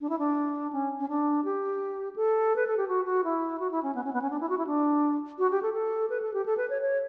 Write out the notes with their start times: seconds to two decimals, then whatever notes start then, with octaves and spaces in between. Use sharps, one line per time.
0.01 D4
0.09 E4
0.19 D4
0.72 C#4
0.99 C#4
1.08 D4
1.45 G4
2.16 A4
2.56 B4
2.67 A4
2.77 G4
2.88 F#4
3.05 F#4
3.24 E4
3.60 F#4
3.71 E4
3.83 C#4
3.95 B3
4.04 C#4
4.13 B3
4.22 C#4
4.30 D4
4.40 E4
4.49 F#4
4.58 E4
4.67 D4
5.39 F#4
5.51 G4
5.62 A4
5.74 A4
6.10 B4
6.22 A4
6.34 G4
6.46 A4
6.57 B4
6.70 C#5
6.82 C#5